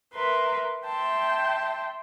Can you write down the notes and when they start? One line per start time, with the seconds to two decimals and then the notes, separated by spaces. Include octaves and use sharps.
0.13 A#4 B4 E5 C6
0.84 E5 G5 A5 C6